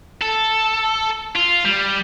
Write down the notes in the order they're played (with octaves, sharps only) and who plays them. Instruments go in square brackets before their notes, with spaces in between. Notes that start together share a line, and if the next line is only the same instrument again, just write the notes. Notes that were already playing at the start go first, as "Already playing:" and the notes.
[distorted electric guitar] A4
F4
G3